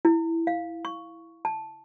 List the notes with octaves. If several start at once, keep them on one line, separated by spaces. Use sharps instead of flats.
E4
F5
C#6
A5